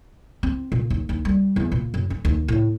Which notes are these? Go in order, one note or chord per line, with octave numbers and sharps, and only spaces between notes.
C4
A#2
D#2
D#2
G3
E2
A#2
F#2
C#4
D#2
A2